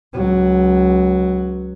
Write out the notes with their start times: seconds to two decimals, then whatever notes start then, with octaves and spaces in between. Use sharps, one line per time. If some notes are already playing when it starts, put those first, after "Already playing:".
0.14 C#2 F#3